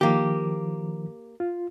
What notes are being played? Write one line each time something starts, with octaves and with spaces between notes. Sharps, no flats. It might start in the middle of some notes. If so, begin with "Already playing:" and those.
D#3 F3 A#3 G4
F4